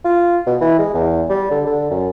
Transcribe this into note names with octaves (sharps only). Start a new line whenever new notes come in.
F4
B2
E3
G#3
E2
G3
D3
D3
F#2